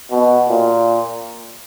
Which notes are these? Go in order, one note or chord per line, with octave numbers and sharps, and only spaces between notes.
B2
A#2